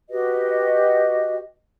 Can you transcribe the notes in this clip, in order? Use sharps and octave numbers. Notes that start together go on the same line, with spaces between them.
F#4 G4 B4 D#5